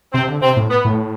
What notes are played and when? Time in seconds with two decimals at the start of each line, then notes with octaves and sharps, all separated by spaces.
0.13 C3 C4
0.28 D3
0.41 C3 C4
0.56 A2
0.70 B3
0.85 A2